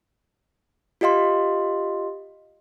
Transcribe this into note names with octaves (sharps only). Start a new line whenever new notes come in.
F4 G4 D#5 F5 C6